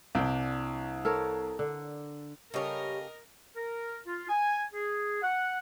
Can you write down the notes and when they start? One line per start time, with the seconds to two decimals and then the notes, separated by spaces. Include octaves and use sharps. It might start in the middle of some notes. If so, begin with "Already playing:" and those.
0.15 C2 D4 G5
1.05 A4 A#4 C#5
1.59 D3
2.54 C#3 G3 G4 A4 A#4 C#5 D#5
3.56 A#4
4.07 F4
4.29 G#5
4.73 G#4
5.22 F#5